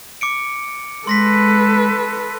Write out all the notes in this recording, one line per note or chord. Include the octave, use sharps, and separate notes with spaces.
D6 C#7 D7
G#3 A4 B4 C6 A#6 B6